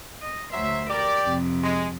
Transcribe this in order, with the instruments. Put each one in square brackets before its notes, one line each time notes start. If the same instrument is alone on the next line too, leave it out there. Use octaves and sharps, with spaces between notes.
[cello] D#5
[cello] D2 C5 [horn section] F#3 E5
[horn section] G4 D5 [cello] A#4
[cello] F2 C3
[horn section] G#3